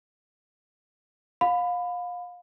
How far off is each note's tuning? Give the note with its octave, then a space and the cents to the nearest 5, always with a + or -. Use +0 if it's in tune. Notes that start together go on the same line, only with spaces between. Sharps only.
F5 +30 B5 +20